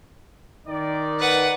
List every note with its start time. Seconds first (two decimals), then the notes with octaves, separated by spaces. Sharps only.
0.66 D#3 D#4 D5
1.19 B4 F#5